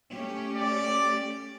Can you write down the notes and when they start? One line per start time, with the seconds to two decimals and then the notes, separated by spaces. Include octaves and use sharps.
0.13 A3 C#4 G4
0.55 D5